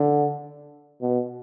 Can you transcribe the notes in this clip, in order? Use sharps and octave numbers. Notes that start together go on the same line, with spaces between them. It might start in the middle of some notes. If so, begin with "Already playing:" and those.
Already playing: D3
B2